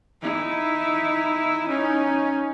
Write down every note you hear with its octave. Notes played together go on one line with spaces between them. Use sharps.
D#4 E4
C#4 D#4